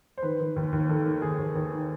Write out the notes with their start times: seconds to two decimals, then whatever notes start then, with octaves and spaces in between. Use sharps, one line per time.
0.17 C5
0.23 D#3 B4
0.40 D#3
0.56 D#2
0.72 D#2
0.89 D#3 A4
1.06 D#3
1.22 D#2 G#4
1.38 D#2
1.55 D#2
1.72 D#3